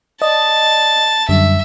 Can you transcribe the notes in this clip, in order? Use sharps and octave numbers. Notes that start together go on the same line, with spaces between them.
D5 D#5 A5
F#2 D3 G3 E5